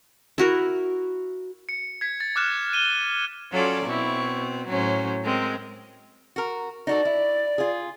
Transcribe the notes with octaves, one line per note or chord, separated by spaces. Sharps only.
E4 F#4 A#4
C#7
G#6 B6
A6
D6 F6 F#6 E7
D#7 G7
F#3 C#4 F4 A4 D5
B2 C4 E4 C#6
A2 F#3 C#4 C5
G#3 C4 A#4
F#4 A#4
D#4 F#4 A4 D5
E4
F4 G#4